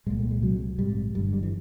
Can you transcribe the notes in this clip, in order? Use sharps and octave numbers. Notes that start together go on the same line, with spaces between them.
C2 A#2 G#3
A3
G#3
C2 C3 F#3
A#1 G#2 G3
G1 G2 D3 G3
G3
E3